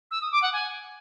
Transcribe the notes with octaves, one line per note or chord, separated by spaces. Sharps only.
E6
D#6
D6
F#5
G#5